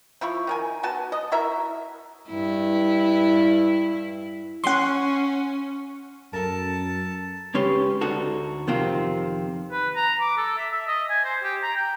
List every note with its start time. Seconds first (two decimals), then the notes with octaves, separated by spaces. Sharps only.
0.21 F3 E4 F4 C#6
0.47 D#3 A#4 G#5
0.83 B3 F#4 G#5 A5
1.12 D#5
1.32 E4 F#4 A#4 E5
2.29 G2 E4
4.64 C#4 F#5 C6
6.33 F#2 A4 A#4 A5
7.54 C#2 G#3 C#4 G4 B4 C6
8.01 D2 D3 D#4 F#4 A4
8.67 F2 C3 D#3 C4 F4
9.71 B4
9.96 A#5
10.21 D6
10.37 A4
10.58 E5
10.72 E5
10.87 D#5
11.10 G#5
11.24 C5
11.43 G4
11.63 A#5
11.76 G5